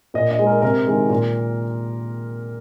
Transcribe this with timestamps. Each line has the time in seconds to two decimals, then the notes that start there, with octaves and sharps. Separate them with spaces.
0.14 A#2 D#5
0.31 D#5
0.39 G#3
0.47 A#4
0.62 C3 A#4
0.87 D#3 G#3
1.10 A#2